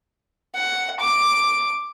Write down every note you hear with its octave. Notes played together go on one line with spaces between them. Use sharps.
F#5
D6